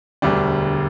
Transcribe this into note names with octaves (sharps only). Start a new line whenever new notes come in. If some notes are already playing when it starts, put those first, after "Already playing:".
E1 D2 D3 G3 D4